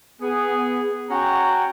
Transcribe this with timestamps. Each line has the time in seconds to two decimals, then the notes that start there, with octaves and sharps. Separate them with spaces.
0.22 B3 G#4
1.10 C#4 F#4 C#5 F#5 G5 A#5